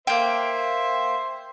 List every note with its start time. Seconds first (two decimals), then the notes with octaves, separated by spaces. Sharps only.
0.07 A#3 C5 E5 G5